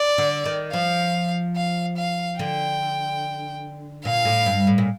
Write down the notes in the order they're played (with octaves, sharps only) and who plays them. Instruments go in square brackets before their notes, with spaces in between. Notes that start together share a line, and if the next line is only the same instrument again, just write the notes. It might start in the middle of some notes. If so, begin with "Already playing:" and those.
Already playing: [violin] D5
[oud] D3
D#3
[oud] F3 [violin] F5
[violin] F5
F5
[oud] D3 [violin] G5
[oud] A#2 [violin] F5
[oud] A2
G2
A2
A#2